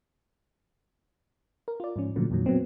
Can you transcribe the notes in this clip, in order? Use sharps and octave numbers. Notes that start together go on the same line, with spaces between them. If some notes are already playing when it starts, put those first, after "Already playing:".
A#4
F4 D5
G#2 F3 C#4
A#2 D3 F3 F#3 A3
F2 A#2 D#3 F#3
A#2 F#3 B3 C4